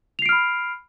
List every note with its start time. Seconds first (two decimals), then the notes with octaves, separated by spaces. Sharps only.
0.19 F7
0.22 C7
0.26 D7
0.29 F6
0.32 B5